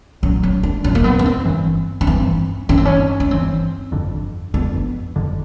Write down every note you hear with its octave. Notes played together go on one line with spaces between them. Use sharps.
B1 A#2 F#3 C#4
C#4
D4
B1 A#2 F#3 C#4
A#3
B3
C#4
C4
G1 G2 E3
C#4
G1 G2 E3 C4
G1 G2 E3 C#4
C4
C#4
C#4
G1 G2 E3 C4
G1 F2 D3
G1 F2 D3 B3
G1 F2 D3